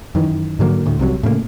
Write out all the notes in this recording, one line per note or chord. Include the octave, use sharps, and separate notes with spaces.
F#2 D#3 E3
G#2 D3 F#3 A#3
D2 A2
C2 C3 F3 F#3
A2 C#3 F#3 A#3